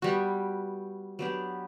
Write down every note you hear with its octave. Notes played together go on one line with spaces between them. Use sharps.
G3 B3 F#4
F#3 B3 D4 G4